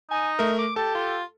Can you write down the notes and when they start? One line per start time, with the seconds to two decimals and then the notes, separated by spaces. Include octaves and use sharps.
0.11 D#4 G#5
0.39 A3 A#4 E5
0.59 D6
0.76 G4 A4 A5
0.95 F4